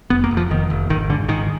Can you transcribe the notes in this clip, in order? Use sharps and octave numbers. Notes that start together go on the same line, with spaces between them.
F1 B3
A#3
F1
F3
F1 D#3
F1
G#1 D#3
G#2 D3
G#2 D#3